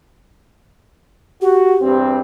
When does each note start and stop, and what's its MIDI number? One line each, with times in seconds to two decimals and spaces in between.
1.42 1.74 66
1.42 1.97 67
1.80 2.20 40
1.80 2.20 43
1.80 2.20 60